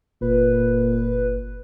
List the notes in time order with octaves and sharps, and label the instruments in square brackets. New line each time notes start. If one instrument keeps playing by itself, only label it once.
[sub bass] F#1 [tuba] A#2 [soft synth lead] B4